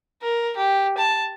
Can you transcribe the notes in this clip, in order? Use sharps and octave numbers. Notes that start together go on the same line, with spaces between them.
A#4
G4
A5